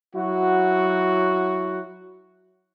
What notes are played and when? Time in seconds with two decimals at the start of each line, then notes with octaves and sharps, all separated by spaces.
0.15 F#3 E4 F#4